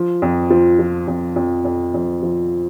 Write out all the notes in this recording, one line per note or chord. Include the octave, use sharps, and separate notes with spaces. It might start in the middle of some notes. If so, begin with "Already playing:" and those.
Already playing: F3
F2
F3
F3
F2
F2
F2
F2
F3